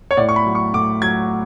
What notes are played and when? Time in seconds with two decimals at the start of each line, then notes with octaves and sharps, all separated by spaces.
0.11 C#5
0.17 A2 D5
0.29 C#6
0.36 B5
0.46 F#3
0.55 C#6
0.74 A2 D6
1.02 F#3 G#6